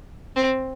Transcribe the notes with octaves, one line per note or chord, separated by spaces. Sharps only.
C4